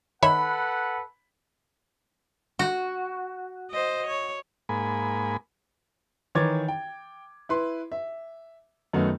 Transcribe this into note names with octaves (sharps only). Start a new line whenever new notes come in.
D#3 A4 B4 C#5 E5 F#5 B5
F#4
C5 D#5
C#5
G#2 A#3 G#5 B5
D#3 E3 C#5 D6 G#6 A6
G5
E4 B4 C6
E5
F#2 D#3 A3 B3 D#4 F#4